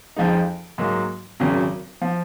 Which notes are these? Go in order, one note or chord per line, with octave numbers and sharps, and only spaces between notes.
F2 F3 G#3 D#4
G#2 F#3 A#3
G#1 F#2 C#3 F#3
F3